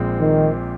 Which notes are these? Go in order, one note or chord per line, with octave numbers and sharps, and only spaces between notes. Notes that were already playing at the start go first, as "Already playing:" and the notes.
Already playing: A#1 A#2 G#3 C4
D#3